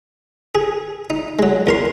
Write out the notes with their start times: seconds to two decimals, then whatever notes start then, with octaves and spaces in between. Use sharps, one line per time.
0.55 G#4
1.10 D#4
1.39 F#3 G#3
1.67 E2 A#4 C6